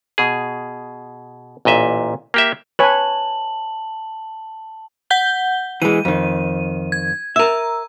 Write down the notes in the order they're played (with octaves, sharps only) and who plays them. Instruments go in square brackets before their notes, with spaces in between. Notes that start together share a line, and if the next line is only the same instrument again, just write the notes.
[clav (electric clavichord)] B2 G#4
A1 A#2 D#5 E5
A#3 G4 E5
[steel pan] B4 C#5 G#5 [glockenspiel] A5 F#7
[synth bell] F#5 G6 G7
[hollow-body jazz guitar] E3 G#3 [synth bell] D#7
[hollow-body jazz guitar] F2 D#3
[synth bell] G#6
[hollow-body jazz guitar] A#4 E5 [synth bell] A#5 E6